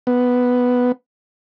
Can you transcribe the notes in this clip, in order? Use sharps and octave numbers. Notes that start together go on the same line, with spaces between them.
B3